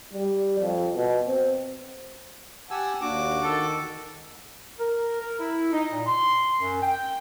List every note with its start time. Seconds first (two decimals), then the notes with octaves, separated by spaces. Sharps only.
0.14 G3
0.60 F2
0.95 B2
1.28 C4
2.71 G4 F#5 G#5 A5 E6
3.01 D#2 A#3 D4 F#4 D6
3.42 D#3 A4
4.80 A#4
5.21 A#4
5.39 E4
5.72 D#4
5.91 A#2
6.07 C6
6.59 F#2
6.82 G5